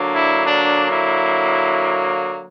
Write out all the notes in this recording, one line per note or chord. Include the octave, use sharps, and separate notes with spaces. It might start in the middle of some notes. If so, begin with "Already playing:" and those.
Already playing: D3 F#3 A#3 D4
E4
D4
E4